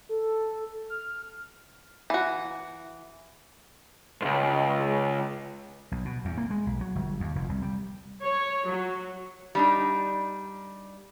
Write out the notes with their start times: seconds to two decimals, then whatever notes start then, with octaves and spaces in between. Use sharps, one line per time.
0.09 A4
0.90 F6
2.10 E3 F#4
4.22 C#2 G#2
5.92 B1
6.05 B2
6.25 E2
6.38 A#3
6.50 G#3
6.66 B1
6.81 F#3
6.95 G1
7.20 D#2
7.35 F1
7.49 C2
7.62 G3
8.22 C#5
8.67 F#3
9.55 G3 D4 D#4